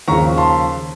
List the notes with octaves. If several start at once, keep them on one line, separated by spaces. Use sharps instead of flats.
D#2 C#3 F3 A#5 C#6
A5 C6